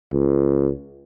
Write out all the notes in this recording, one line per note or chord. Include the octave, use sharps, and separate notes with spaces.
C#2